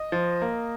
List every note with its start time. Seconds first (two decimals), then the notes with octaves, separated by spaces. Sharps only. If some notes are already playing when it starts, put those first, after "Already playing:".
Already playing: D#5
0.12 F3
0.42 A#3